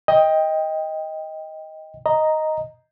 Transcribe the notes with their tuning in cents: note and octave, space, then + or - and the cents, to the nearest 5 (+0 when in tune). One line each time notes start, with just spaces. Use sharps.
D#5 +15 G5 +15
D#5 +5 A#5 +0